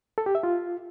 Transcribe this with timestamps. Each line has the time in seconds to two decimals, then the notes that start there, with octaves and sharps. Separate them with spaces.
0.18 A4
0.26 G4
0.35 E5
0.43 F4